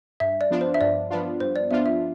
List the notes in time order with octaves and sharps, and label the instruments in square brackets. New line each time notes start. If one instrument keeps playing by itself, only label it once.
[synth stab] G2 [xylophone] E5
[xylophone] D5
[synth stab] F3 B3 D4 F4
[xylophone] C5
E5
[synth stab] G2 [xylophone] D5
[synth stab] F3 B3 D4 F4
[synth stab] G2 [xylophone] C5
[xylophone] D5
[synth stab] F3 B3 D4 F4 [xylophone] E5
[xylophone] E5